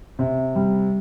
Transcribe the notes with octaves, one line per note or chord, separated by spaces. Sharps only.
C3
G3